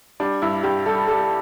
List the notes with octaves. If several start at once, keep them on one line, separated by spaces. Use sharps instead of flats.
G3 D4
G2 E4
G2 G4
G3 A4
G3 A4